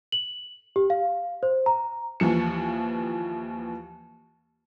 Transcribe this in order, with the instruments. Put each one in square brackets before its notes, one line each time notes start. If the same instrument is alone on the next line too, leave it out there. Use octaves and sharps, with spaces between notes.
[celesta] F#7
G4
F5
C5
A#5
[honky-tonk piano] D#2 E3 F3 C#7